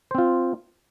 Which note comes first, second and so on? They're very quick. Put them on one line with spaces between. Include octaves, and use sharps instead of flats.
C5 C4 F4